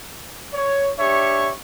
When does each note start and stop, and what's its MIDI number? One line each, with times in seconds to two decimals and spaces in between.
0.54 0.91 73
0.99 1.53 62
0.99 1.53 67
0.99 1.53 73
0.99 1.53 76
0.99 1.53 85